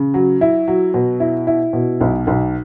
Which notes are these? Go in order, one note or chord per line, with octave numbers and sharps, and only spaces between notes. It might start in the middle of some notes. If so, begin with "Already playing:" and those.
Already playing: C#3
F#3
E4
F#3
B2
E4
E4
B2
B1
B1